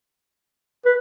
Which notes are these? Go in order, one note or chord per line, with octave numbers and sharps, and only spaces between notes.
B4